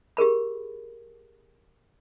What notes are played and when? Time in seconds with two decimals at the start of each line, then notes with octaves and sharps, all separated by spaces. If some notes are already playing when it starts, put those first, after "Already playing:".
0.17 G4 G#4 A#4 B5